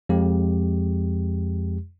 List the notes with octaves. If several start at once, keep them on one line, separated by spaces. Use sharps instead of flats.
F2 G#3 G4